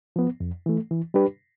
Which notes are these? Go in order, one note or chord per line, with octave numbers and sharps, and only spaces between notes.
F3 B3
F2
E3 A3
E3
G3 D4 G4 B4